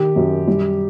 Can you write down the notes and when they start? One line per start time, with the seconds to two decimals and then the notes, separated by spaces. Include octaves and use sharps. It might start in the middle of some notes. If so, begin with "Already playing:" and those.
Already playing: D#3 G4
0.16 F#2
0.47 G3